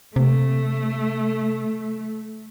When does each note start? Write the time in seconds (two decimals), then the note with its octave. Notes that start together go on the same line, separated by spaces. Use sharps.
0.16 C3 A3